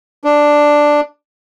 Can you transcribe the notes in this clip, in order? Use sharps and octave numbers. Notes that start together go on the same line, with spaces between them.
D4